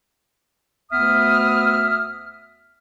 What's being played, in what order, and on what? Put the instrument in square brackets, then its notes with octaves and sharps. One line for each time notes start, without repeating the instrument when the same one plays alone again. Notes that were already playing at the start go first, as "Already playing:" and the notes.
[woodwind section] D2 B3 E5 D#6 F6